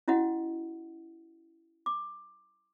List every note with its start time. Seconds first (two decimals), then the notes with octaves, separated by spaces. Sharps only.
0.08 C#4 E4 F#4 D#5 F#5
1.86 D6